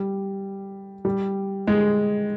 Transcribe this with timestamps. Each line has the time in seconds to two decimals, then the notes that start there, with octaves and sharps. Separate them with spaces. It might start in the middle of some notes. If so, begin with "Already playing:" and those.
Already playing: G3
1.05 G3
1.67 G#3